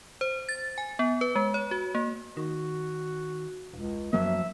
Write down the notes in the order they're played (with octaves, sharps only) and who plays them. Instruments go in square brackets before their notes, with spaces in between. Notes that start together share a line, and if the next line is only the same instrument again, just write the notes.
[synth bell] C5
A6
G#5
B3
B4
G#3
C#5
F#4
A#3
[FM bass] D#3 [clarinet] F#4
[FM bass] E1 [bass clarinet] C#2
[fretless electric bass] F#2 F#3 A#3 [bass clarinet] F3 [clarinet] E5